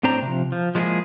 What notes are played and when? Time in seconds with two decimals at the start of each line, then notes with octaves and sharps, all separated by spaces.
0.03 A2 C4 D4 C5 A#5
0.23 C3 F3
0.52 F3
0.75 F3 G#3 A#3 D4 E4 G#4